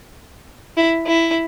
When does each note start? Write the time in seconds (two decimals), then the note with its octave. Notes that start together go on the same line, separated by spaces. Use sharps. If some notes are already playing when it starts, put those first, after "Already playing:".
0.77 E4
1.06 E4